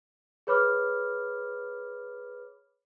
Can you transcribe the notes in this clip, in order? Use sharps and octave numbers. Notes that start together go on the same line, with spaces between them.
G#4 B4 C#5 B5 D6 F6